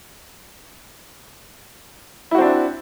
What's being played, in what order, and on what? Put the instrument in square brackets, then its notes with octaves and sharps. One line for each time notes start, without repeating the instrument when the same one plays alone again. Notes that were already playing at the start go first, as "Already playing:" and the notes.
[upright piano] E4
F#4
C4
D4